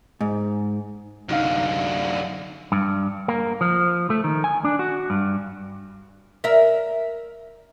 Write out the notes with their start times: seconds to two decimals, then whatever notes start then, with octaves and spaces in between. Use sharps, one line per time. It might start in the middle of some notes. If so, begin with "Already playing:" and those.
0.21 G#2
1.29 C2 F#2 D3 D#4 F5
2.72 G2
3.28 A#3
3.61 F3
4.10 A3
4.24 D#3
4.44 G#5
4.64 D4
4.79 F#4
5.10 G2
6.44 A#4 E5